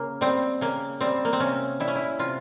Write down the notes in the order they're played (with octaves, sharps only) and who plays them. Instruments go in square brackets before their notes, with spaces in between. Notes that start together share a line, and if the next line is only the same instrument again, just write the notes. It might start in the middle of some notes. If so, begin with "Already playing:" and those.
Already playing: [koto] C#3 A#3
G3 C4
C#3 A#3
G3 C4
A#3
C4
C3 C#4
G3 E4
C#4
E4
C3 F4